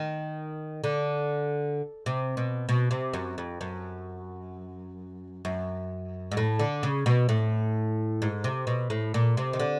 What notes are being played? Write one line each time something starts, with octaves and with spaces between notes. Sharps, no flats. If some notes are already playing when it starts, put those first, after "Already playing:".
Already playing: D#3
D3
C3
B2
B2
C3
F#2
F2
F#2
F#2
G#2
A2
D3
C#3
B2
A2
G#2
C3
B2
A2
A#2
C3
D#3
D3